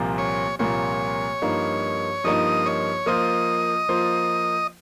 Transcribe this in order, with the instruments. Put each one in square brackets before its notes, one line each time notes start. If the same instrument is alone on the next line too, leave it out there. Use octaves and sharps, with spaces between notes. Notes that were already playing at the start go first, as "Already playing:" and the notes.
Already playing: [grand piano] C2 A#2 F3 A#3
[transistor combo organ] C#5
[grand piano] C2 A#2 F3 A#3 [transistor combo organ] C#5
[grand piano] G2 F3 A#3 D#4
[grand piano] G2 F3 A#3 D#4 [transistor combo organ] D#5
[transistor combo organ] C#5
[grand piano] F3 A#3 F4 C5 [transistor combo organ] D#5
[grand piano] F3 A#3 F4 C5